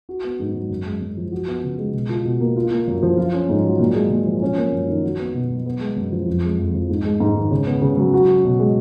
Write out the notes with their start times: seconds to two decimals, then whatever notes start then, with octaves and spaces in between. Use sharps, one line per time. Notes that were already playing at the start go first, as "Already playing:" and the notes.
0.09 F#4
0.24 B3
0.40 G#2
0.55 F#3
0.69 F#2
0.86 G#3
1.01 F#2
1.17 F3
1.32 F#4
1.48 B3
1.63 C#3
1.78 G#3
1.94 B2
2.09 F4
2.25 B2
2.40 A#3
2.56 F4
2.71 A#3
2.87 F#2
3.03 F3
3.18 F4
3.34 C#4
3.49 G#2
3.64 F#3
3.79 A#2
3.95 G#3
4.10 A#2
4.26 F3
4.42 C#4
4.57 A#3
4.72 F#2
4.88 D#3
5.04 F#4
5.19 B3
5.34 B2
5.50 F#3
5.66 B3
5.81 G#3
5.96 F#2
6.12 F3
6.27 F2
6.43 G#3
6.59 F2
6.74 F3
6.90 G#2
7.05 G#3
7.20 G#2
7.35 D#3
7.51 C#3
7.67 B3
7.82 C#3
7.97 F#3
8.14 F#4
8.29 C#4
8.45 B2
8.59 G#3